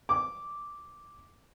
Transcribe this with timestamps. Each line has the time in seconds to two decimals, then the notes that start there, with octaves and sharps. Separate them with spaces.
0.09 D6